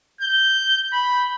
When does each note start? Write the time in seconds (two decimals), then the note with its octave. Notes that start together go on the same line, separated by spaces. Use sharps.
0.21 G6
0.93 B5